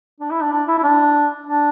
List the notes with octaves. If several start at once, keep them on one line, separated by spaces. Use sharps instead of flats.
D4
E4
D4
D4
E4
E4
D4
D4